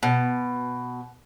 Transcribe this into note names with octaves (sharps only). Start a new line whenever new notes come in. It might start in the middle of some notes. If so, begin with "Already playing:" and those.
B2